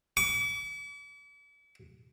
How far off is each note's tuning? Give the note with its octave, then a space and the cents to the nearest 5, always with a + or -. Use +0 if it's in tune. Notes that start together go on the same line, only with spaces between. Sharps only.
D6 -45